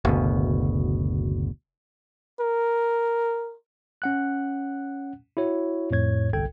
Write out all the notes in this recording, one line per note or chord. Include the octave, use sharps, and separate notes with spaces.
F#1 D2 B2
A#4
C#4 F#5 F#6
E4 F#4 C#5
F2 A2 C#5 G#6
G1 C2 A4 G5 G#6